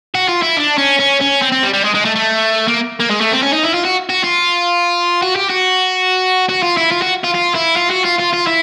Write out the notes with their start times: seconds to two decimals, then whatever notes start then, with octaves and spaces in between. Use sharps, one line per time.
0.15 F#4
0.29 F4
0.43 E4
0.57 D4
0.78 C#4
0.99 C#4
1.21 C#4
1.42 C4
1.52 C4
1.63 G3
1.73 G3
1.84 G#3
1.94 G#3
2.05 A3
2.16 A3
2.68 A#3
3.00 A#3
3.11 G#3
3.21 A3
3.32 C4
3.43 C#4
3.53 D#4
3.64 E4
3.74 F4
3.85 F#4
4.10 F#4
4.24 F4
5.23 F#4
5.36 G4
5.50 F#4
6.49 F#4
6.63 F4
6.77 E4
6.92 F4
7.02 F#4
7.24 F4
7.34 F4
7.54 E4
7.76 F4
7.90 F#4
8.04 F4
8.18 F4
8.33 F4
8.47 E4